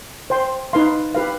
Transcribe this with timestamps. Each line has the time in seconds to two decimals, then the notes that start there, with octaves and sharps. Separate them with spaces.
0.30 C5 G5 C6
0.73 D#4 B4 F5 C6
1.15 G4 B4 F5